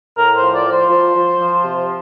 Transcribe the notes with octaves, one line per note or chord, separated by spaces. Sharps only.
A2 A#4
C5
F3
D5
F3
C5
F3
F3
F3
C3